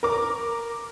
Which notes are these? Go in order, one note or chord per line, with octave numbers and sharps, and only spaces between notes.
A#4 D6